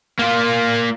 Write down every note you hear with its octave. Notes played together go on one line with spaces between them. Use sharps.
A#3 F4